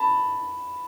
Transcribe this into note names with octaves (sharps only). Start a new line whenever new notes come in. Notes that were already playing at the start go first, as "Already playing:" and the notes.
Already playing: A5 B5